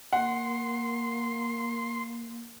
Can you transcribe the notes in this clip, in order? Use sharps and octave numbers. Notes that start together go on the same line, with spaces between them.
A#3 F#5 C6